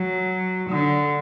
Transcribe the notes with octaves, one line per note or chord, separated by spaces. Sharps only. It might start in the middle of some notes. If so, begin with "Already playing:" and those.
Already playing: F#3
D3